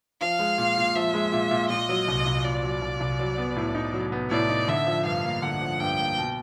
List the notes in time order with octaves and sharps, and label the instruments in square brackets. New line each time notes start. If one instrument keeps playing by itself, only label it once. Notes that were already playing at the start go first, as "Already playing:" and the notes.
[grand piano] F3 [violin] F5
[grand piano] G#3
A#2
A#2
[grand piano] F3 [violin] E5
[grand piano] G#3
A#2
A#2
[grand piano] A#2 [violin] D#5
[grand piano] F#3
C2
C2
[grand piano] A#2 [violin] D5
[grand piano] F#3
C2
C2
F#3
B3
A2
D#4
F#3
B3
[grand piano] A2 [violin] D5
[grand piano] D#4
[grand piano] D3 [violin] E5
[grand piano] F3
[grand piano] G2 [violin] F5
[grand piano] A#3
[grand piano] D3 [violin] F#5
[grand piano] F3
[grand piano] G2 [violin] G5
[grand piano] A#3
B2